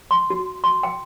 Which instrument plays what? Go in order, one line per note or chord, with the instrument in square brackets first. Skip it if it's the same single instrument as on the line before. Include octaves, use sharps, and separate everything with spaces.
[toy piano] C6
F#4
C6
G5